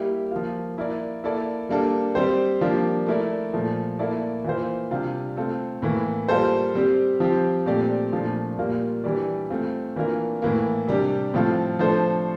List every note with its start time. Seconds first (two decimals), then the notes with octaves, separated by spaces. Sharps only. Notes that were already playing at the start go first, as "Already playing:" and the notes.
Already playing: G3 A#3 E4 G4
0.31 F3 A#3 F4
0.77 A#3 E4 A#4 D5
1.24 A#3 E4 A4 D5
1.69 G3 A#3 D4 A4
2.15 G3 C4 G4 C5
2.61 F3 A#3 D4 G4
3.06 A3 E4 A#4 D5
3.53 A#2 F3 A3
3.99 A#3 E4 A4 D5
4.44 E3 A#3 F4 C5
4.91 C3 G3 D4 F4
5.37 A3 C4 F4 A4
5.82 A2 E3 A#3
6.29 G3 A#3 F4 A4 C5
6.75 G3 C4 G4
7.20 F3 C4 G4
7.66 A#2 A3 C4 G4 D5
8.12 A#2 F3 A3 D4
8.57 A#2 G3 A#3 F4
9.04 E3 G3 D4 G4 D5
9.50 A3 C4 F4
9.96 E3 A#3 D4 F4 A#4
10.42 A2 E3 A#3
10.88 C3 G3 D4 G4
11.34 A2 F3 C4 F4 A4
11.79 F3 A3 D4 A4 C5